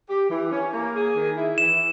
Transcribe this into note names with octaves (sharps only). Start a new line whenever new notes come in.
G4
E3
C#4
A#3
G#4
D#3
E4
E3 E7